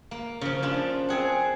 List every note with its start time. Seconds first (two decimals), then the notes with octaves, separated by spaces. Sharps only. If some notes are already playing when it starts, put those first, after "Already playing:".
0.11 A#3
0.41 C#3 F3
0.62 F3 D4 F4
1.08 C4 G#4 F#5